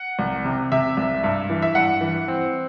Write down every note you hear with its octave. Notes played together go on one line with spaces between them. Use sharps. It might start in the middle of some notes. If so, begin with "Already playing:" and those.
Already playing: F#5
C2
C3
C3 E5
C2
G2
E3
E5
G2 F#5
E3
C4